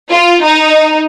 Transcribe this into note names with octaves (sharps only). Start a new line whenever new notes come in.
F4
D#4